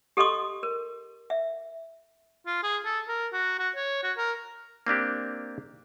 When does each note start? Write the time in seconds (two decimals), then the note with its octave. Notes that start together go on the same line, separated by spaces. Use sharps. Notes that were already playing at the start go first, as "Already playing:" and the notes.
0.17 G4 A4 D#5 C6 C#6 D#6
0.63 A#4
1.30 E5
2.46 F4
2.63 G#4
2.85 A4
3.08 A#4
3.33 F#4
3.59 F#4
3.76 C#5
4.03 F#4
4.18 A#4
4.87 A#3 C4 D4 G4